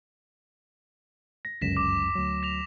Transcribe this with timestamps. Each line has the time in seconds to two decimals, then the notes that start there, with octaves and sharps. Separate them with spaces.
1.45 A#6
1.61 G1 C#2 F#2 A#6 B6 E7
1.77 D6
2.15 D2 F#3
2.43 A#6 F7